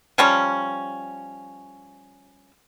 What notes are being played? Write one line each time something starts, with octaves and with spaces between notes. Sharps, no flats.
F3 G3 C#4